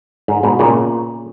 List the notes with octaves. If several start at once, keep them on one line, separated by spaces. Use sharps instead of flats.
G#2
G#2 B2
A#2 C#3